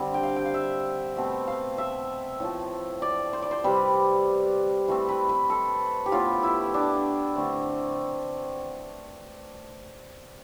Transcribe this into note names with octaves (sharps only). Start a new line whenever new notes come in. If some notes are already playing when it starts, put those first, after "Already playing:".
Already playing: D3 G3 C4
G5
F5
G5
F5
E5
B2 A3 C4
F5
E5
A2 F3 A3
D5
C5
D5
C5
C3 G3 C4 B4
E3 A3 C4
B4
B4
A4
G4
A2 E3 B3 F4
E4
D4
D3 A3 C4